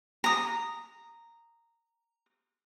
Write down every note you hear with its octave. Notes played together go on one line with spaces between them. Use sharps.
A#5 D#6